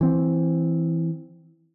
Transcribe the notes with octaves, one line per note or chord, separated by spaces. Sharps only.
E3 C4